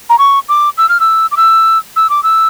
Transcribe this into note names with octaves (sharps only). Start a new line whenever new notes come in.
A#5
C#6
D6
E6
F6
E6
D6
E6
E6
D6
E6